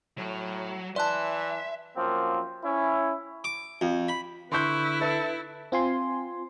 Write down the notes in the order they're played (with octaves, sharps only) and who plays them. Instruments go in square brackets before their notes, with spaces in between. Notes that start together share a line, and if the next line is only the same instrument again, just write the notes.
[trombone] A2 [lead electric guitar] F#3
[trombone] E3 [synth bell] D5 A5 [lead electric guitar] E5 [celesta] C6 F#6
[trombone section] F#2 F3 A#3 C4
C#4 E4
[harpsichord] D6
F2
B5
[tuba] D3 [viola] E4 [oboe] B4 [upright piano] C6 C#6 G6
[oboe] A4 [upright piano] B4 E5
[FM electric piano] C4 F4 G#5 C6